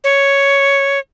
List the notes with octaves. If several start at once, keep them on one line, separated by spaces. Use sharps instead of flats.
C#5